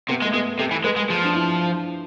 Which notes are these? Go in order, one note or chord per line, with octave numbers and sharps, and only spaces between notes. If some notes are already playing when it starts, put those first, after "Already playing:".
C3 B3
G#3
A3
G#3 B3
C3 A4
E3
G#3 B4
G#3
F3 G#4
D4
E4